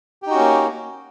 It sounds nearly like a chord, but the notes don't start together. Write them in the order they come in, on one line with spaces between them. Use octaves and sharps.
G4 D#4 F#4 C#4 A#3